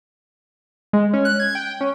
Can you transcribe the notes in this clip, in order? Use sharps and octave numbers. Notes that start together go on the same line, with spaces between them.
G#3
C#4
F#6
G#6
G5
C#4